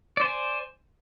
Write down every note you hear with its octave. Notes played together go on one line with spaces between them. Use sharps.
C5 D5 G#5